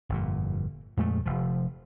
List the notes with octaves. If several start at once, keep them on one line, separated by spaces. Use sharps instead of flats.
G1 F2 A#2
F2 A#2 G#3 A3
F1 F3